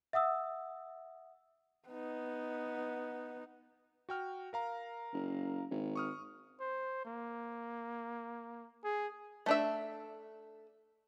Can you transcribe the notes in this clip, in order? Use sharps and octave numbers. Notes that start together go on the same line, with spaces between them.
E5 F#5 D#6 E6
B3 D#4
F#4 G5 F6
A#4 F5 A#5
F#1
G#1
C#6 D#6 F6
C5
A#3
G#4
A3 D4 E5